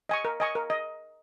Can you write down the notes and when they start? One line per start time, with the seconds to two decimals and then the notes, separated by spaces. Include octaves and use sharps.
0.09 D#5 G#5 C#6
0.25 A#4
0.40 D#5 G#5 C#6
0.55 A#4
0.70 D#5